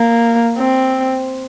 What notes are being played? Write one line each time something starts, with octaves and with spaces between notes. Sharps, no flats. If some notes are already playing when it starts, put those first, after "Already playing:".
Already playing: A#3
C4